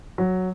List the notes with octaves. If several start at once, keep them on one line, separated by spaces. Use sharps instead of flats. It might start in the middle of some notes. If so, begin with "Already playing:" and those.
F#3